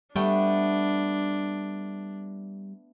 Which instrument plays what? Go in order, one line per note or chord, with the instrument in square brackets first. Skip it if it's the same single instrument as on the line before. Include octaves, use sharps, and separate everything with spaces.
[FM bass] G3 [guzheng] A3 B3 G5 [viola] D4